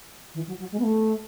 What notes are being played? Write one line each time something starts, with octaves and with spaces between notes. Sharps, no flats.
E3
F#3
F#3
G#3
B3
A3